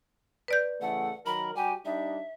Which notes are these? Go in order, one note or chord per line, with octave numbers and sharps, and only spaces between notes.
B4 D5 G6
C#3 E3 A3 F#5
D#3 F#3 A#4 B5
G3 F#4 G4 G#5
G3 D4 D#4 E5